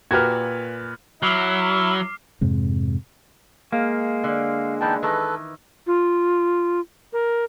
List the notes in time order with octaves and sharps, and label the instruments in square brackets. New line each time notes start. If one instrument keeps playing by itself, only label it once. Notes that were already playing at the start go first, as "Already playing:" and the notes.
[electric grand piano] A#2 B4 [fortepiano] F#4 G4 A#4 [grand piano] F6 G#6
[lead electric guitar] F#3 [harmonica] E4 E5 [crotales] D6 F6 C7
[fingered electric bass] F2 G#2 C3 G#3
[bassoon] G#3 [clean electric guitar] A#3 [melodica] F5
[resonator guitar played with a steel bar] D3
[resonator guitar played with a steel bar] D3 E3 B3 [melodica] D#4 G5 A5
[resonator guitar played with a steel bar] D#3 E3 [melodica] A4 B4
[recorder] F4
A#4